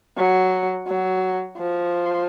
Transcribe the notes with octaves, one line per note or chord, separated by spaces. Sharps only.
F#3
F#3
F3